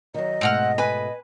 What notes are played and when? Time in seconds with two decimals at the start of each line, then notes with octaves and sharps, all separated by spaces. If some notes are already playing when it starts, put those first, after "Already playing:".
0.14 D#3 F#3 D#5
0.41 G#2 B2 A3 C4 F#5 F6
0.78 B4 G#5 B5